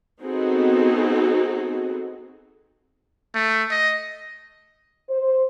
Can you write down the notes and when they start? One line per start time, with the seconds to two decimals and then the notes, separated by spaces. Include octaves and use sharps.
0.22 B3 C4 D#4 F#4 G#4 A4
3.34 A3
3.71 D#5
5.10 C5